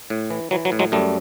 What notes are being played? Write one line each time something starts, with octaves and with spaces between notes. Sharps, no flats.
A2
E3
E3 F#3
F#3
A2
F#3 G#3
F#2 G3 A3